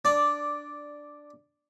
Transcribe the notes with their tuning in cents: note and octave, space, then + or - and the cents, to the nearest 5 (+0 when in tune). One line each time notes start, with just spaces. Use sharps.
D4 +0 D5 -5